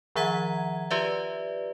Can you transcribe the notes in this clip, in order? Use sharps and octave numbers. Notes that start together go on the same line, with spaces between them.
D#3 F3 E5 F#5 A#5 G#6
F4 G4 B4 D5 E5